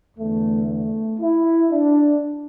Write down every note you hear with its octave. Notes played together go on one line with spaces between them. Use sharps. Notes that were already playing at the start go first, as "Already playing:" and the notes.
E2 D3 A3
A3
E4
D4